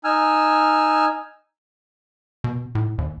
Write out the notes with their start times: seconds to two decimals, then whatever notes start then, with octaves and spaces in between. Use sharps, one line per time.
0.04 D#4 G#5 E6 F6
2.44 B2
2.75 A2
2.98 D#2